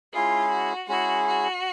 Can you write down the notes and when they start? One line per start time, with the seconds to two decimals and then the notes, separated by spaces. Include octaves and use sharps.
0.13 G#3 C#4 E4 F4 G#4
0.51 F#4
0.88 G#3 C#4 E4 F#4 G#4
1.26 F#4